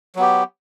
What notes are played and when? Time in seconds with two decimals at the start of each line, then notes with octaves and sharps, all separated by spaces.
0.16 F#3
0.19 B3
0.22 G4